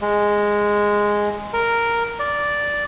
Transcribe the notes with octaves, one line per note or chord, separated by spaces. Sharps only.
G#3
A#4
D5